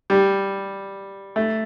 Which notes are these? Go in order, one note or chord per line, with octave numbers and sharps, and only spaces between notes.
G3
A3